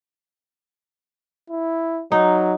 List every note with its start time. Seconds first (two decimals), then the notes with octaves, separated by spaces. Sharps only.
1.50 E4
2.12 F#3 D#4